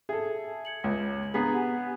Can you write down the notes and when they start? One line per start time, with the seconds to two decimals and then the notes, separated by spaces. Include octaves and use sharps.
0.09 G#4 A4 E5
0.65 G#6 C#7 F#7
0.84 C#2
1.34 B3 D4 G#4 A#5 B6
1.52 G4 F#5 G#5